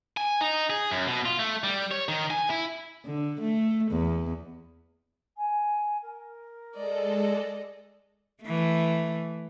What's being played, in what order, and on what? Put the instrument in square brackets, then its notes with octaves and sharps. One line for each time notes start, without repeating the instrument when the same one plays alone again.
[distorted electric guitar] G#5
D#4
G#4
F#2
B2
F4
A3
G3
C#5
D#3
G#5
E4
[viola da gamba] D3
A3
E2
[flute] G#5
A#4
[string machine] G#3 A4 [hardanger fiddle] D5 D#5
[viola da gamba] E3 A3